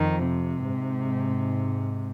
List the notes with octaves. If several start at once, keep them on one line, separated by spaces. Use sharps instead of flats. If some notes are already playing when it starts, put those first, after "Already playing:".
Already playing: F2 D#3
C3
G#2